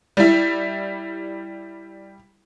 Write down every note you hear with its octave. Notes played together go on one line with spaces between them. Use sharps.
G3 E4